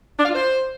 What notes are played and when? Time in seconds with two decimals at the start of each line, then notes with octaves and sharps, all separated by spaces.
0.18 D4
0.23 F5
0.29 F4
0.34 C5